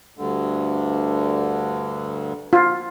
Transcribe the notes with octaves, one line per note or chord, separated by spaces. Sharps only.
D2 G2 D3
F4